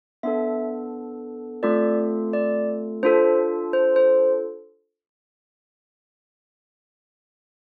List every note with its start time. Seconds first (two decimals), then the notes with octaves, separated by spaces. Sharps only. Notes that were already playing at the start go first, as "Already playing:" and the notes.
0.23 B3 D4 A4 E5
1.63 A3 C4 F4 A4 D5
2.33 D5
3.03 D4 F4 A4 C5
3.73 C5
3.96 C5